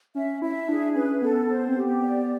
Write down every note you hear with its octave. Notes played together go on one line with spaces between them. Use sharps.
C#4 E5
E4 E5
D4 G#4
C#4 B4
B3 A4
C5
C4
B3 G4
D5